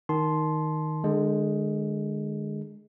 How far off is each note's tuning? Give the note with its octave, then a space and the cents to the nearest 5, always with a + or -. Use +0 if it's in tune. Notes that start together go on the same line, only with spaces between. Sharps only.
D#3 +0 A5 -25 C6 +0
D3 +35 G#3 +0